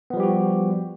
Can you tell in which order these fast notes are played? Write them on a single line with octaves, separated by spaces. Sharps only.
B3 F3 G3 G4 F#4